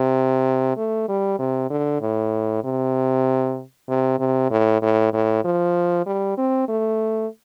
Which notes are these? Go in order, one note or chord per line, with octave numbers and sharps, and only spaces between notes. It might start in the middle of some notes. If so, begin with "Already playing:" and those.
Already playing: C3
A3
G3
C3
D3
A2
C3
C3
C3
A2
A2
A2
F3
G3
C4
A3